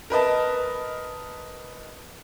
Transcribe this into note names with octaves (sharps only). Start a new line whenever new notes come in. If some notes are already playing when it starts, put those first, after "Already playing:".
A#4 B4 D#5 A5